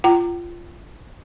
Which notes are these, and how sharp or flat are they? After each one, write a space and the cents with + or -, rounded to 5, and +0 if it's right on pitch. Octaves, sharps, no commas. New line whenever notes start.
F4 -15 G5 -40 A#5 -15